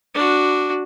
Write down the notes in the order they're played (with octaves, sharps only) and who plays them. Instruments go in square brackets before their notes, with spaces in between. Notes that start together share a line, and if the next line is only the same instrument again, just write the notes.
[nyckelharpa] D4 F#4